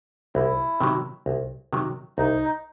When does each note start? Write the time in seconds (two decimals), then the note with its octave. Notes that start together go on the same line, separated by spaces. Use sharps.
0.35 C2 E4
0.81 C3 D#3 F#3
1.26 C2
1.73 C3 D#3 F#3
2.18 C2 D#4